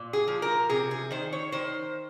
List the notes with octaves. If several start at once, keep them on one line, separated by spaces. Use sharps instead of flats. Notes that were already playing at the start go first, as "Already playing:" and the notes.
Already playing: A#2
G#4
F3
A#4
C3 G#4
G#4
D#3 C5
C#5
D#3 C5